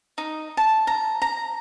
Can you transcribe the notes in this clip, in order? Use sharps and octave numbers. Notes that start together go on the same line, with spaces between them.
D#4
A5
A#5
A#5